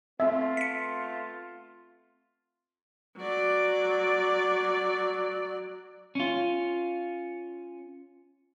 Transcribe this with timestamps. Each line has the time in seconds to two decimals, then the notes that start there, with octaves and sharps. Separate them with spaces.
0.20 A3 B3 C4 F4 E5
0.57 B6 C#7
3.17 F#3 D5
6.15 C#4 F4